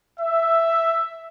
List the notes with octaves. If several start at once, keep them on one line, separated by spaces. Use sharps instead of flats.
E5